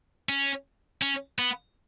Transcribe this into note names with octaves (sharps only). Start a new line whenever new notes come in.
C#4
C#4
B3